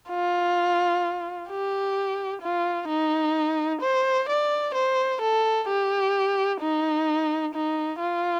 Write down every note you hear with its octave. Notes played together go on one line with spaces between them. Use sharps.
F4
G4
F4
D#4
C5
D5
C5
A4
G4
D#4
D#4
F4